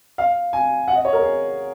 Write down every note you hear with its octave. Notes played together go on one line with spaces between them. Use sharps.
F5
G#5
F#5
D#5
C#5
A#4
G#4